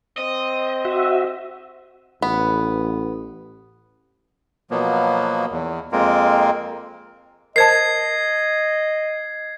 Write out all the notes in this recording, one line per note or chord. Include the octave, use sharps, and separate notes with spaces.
C4 D#5
F#4 E5
A1 B3
B2 F3 F#3 A#3 B3
E2
F2 G#3 A#3 C4 F4 A#4
A#4 C5 D#5 A5 G#6 C7